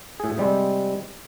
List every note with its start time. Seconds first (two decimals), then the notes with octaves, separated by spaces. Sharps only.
0.20 A2 G#4
0.38 C3 G3 G#3 C4